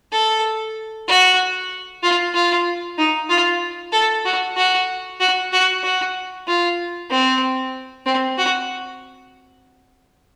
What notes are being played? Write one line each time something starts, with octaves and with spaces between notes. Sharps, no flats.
A4
F#4
F4
F4
D#4
F4
A4
F#4
F#4
F#4
F#4
F#4
F4
C4
C4
F#4